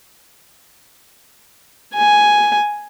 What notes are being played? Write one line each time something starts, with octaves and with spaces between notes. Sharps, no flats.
G#5